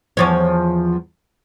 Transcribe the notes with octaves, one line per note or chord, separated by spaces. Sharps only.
E2 F3 C#5